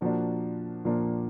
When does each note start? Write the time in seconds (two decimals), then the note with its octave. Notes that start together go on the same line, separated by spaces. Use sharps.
0.01 A#2 F3 A#3 D4 F#4
0.85 A#2 F3 A#3 D4